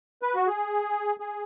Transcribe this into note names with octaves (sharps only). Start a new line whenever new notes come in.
B4
F#4
G#4
G#4